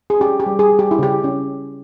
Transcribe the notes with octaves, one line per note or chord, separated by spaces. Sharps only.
G#4
C#4 G4
G4
G3
G#4
G3
G4
E4
C#3 G4
C#4